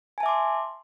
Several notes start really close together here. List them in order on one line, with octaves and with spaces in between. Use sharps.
G#5 A5 E5 D6 C6